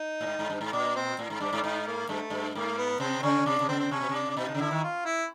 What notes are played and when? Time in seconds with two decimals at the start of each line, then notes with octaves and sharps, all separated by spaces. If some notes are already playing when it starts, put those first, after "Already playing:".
Already playing: D#4
0.21 A2
0.27 G#2
0.39 G#2
0.50 G2
0.61 G#2
0.72 A#2 D4
0.96 C4
1.19 A2
1.30 G#2
1.40 G2 D4
1.53 G#2
1.56 D4
1.64 G#2 D#4
1.87 A#3
2.09 G2 A3
2.30 G2
2.55 G#2 A#3
2.78 B3
3.00 C3 C4
3.22 C#3 C#4
3.46 C3 D4
3.60 C3
3.68 C#3 C4
3.80 C4
3.91 C3 C#4
4.00 B2
4.09 C3
4.14 D4
4.30 D4
4.37 B2 D#4
4.49 C3
4.54 C#3
4.60 D3 E4
4.71 D#3
4.83 F4
5.05 E4